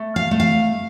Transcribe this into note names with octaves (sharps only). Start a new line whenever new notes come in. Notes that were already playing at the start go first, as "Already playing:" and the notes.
Already playing: A3
F5
A3
F5